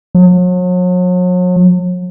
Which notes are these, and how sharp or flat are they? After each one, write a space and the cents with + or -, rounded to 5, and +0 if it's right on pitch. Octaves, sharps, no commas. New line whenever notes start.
F#3 -40